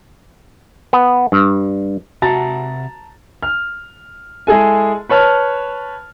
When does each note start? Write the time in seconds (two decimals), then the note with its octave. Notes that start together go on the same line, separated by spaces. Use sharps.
0.93 B3
1.32 G2
2.22 C3 F#4 E5 F#5 A5 A#5 A6
3.43 F6
4.47 G#3 E4 G#4 A4 G#5
5.09 B4 C#5 A5 F6